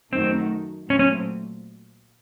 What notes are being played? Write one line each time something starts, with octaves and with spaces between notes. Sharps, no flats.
F#2 D#3 A3 C4 D#4 F#4
A#2 F#3 A3 C4 C#4
C#4